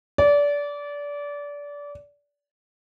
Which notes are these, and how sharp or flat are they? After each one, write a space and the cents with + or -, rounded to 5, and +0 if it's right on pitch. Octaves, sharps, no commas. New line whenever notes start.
D5 -25